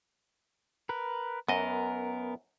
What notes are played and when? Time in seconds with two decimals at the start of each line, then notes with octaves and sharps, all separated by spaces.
0.89 A#4 B4
1.49 F#2 B3 A#4 D#5